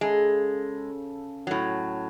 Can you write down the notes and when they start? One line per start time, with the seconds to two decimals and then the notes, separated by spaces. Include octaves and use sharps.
0.01 C#3 G#3 A4
1.47 A2 F#3